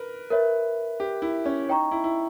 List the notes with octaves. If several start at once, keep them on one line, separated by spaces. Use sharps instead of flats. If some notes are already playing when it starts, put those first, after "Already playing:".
Already playing: A#4 B4
A#4 B4 C#5 E5
G4
E4
C#4
D#4 C#5 G5 A#5 C#6
E4
E4